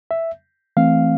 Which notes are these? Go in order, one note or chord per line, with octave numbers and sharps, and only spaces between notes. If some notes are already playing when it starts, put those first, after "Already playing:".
E5
E3 A3 C4 F5